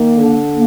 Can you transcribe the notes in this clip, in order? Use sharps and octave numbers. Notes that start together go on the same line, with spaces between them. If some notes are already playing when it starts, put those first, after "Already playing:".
Already playing: D#3 A#3
D3
A#3